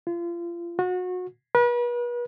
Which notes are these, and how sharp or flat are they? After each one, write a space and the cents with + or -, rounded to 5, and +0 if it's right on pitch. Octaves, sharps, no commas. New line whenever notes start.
F4 -30
F#4 -30
B4 -40